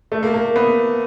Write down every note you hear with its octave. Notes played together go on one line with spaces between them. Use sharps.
A3
A#3
A#3
B3